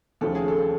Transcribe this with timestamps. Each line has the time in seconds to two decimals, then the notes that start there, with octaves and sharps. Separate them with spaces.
0.21 D#2 C#3 F3 A3 C#4 A4
0.35 G#4
0.48 A4